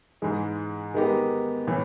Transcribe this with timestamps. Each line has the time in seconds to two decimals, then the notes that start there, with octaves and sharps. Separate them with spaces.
0.22 G#2 E3 G#3
0.94 D#3 G#3 B3 D#4 G4
1.67 A2 E3